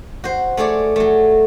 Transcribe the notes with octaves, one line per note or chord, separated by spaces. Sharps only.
F#4 C5
A3 G#4 C#5 D5
F#3 A3